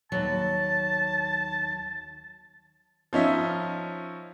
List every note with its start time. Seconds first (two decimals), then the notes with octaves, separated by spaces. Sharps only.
0.12 D#2 F#3 A5
3.13 F3 C#4 D#4 E5